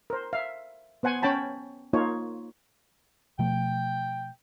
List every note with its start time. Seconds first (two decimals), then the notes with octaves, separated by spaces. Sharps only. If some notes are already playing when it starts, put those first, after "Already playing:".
0.10 A#4 C5
0.33 E5 F5
1.03 B3 C5 F#5 G#5
1.22 C#4 C#5 G5 A5 B5
1.93 A#3 D#4 F4 C#5
3.39 B2 F3 A3 G5